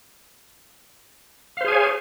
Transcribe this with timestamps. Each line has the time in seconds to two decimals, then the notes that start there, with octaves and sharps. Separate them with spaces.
1.57 F5
1.61 C5
1.64 G#4
1.68 G#5
1.72 C#5